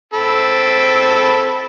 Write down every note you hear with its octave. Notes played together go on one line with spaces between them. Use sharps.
C4 A4 B5